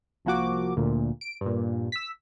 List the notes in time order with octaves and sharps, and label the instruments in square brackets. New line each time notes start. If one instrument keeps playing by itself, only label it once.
[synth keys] C2 F3 A#3 F#4 D6
D2 A#2
D7
G2 A#2
E6 B6